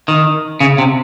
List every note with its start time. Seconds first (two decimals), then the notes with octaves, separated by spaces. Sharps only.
0.08 D#3
0.60 C#3
0.78 C3